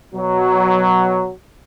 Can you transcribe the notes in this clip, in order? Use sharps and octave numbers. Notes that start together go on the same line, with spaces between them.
B2 F#3